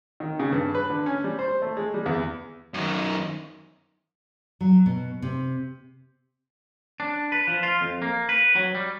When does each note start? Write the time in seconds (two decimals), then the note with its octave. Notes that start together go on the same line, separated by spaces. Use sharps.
0.20 D#3
0.39 C#3
0.52 G2
0.75 B4
0.90 D3
1.06 C#4
1.24 G3
1.39 C5
1.62 A3
1.77 G#3
1.94 G3
2.06 E2
2.74 F#2 D#3
4.61 F#3
4.86 B2
5.22 C3
7.00 D4
7.32 B4
7.48 F3
7.63 F4
7.81 F2
8.02 A#3
8.29 B4
8.55 F#3
8.75 G3